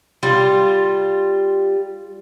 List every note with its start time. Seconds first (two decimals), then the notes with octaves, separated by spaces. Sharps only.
0.23 G3 F4